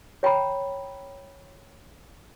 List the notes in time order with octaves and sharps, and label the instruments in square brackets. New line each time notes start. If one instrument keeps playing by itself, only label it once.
[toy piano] C#5 G5 A#5 B5